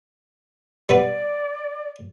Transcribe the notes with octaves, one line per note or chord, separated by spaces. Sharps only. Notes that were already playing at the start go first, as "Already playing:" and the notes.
G3 B3 B4 D5